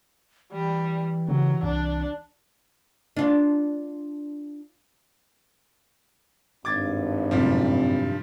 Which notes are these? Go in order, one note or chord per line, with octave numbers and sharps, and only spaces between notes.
E3 G3
C#3 F#3
C2 D4
D4 F4
G#1 G2 D6 G#6 A6
F#2 A2 C3 F3 G3